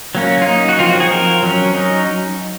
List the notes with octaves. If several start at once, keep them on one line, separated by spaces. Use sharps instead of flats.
F#3 A#3 C#4
F4
D#4
F#4
F3 C4 F4
F#4
G#4
A#4
F#3 C#4
D#4